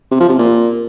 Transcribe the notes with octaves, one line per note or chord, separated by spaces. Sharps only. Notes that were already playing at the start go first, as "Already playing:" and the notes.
C3
F3
C3
A#2